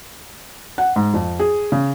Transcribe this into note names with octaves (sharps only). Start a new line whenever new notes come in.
F#5
G#2
F2
G#4
C#3